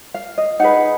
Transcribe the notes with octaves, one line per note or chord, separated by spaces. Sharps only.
F5
D#5
D#4 G#4 B4 F#5